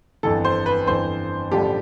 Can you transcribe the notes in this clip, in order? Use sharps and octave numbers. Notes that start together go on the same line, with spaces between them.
G1 F2 E3 A4
C5
B4
G1 F2 E3 C5
A1 G2 D3 F3 G4